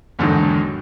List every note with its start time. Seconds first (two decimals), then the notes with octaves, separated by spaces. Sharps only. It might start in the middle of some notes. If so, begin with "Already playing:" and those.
0.19 E2 G#2 D3 D#3 F#3